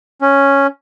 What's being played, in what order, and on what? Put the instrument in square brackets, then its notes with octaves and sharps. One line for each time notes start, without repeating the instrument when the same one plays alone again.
[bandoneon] C#4